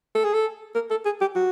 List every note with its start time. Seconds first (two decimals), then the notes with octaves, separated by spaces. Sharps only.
0.15 A4
0.24 G#4
0.34 A4
0.75 A#4
0.90 A4
1.05 G#4
1.21 G4
1.35 F#4